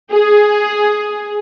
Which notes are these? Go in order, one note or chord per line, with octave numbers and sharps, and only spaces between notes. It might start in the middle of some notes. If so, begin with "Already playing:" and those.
G#4